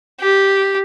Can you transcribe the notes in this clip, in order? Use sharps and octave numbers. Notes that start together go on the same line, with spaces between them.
G4